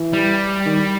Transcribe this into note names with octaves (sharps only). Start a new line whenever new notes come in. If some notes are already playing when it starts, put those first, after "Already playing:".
Already playing: E3
G3
D#3